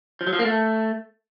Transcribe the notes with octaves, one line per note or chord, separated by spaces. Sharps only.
F3
F#3
F3
A#3
A3